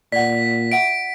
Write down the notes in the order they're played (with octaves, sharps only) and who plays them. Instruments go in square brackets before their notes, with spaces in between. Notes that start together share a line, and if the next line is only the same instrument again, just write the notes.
[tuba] A#2 [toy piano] D5 F#5 [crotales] B6
[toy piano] F4 E5 F#5 [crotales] D7